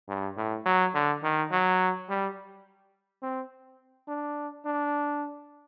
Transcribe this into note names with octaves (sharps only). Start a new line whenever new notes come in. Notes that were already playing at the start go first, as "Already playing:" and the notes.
G2
A2
F#3
D3
D#3
F#3
G3
C4
D4
D4